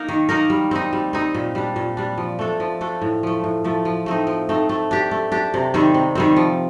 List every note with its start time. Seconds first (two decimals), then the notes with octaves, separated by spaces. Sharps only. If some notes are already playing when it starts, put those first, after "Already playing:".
Already playing: A#3 D#4 A#4
0.08 D#3
0.29 A#3 D#4 A#4
0.50 G3
0.71 C4 D#4
0.93 G3
1.13 C4 D#4
1.35 A#2
1.55 G3 D4
1.76 A#2
1.97 G3 D4
2.18 F3
2.39 A3 D4 A4
2.60 F3
2.81 A3 D4 A4
3.01 A2
3.23 F3 A3
3.44 A2
3.64 F3 A3
3.85 F3
4.06 A3 C4 D#4
4.27 F3
4.49 A3 C4 D#4
4.69 A3
4.91 D4 G4
5.11 A3
5.32 D4 G4
5.54 C3
5.74 D#3 G3 C4
5.94 C3
6.15 D#3 G3 C4
6.36 F3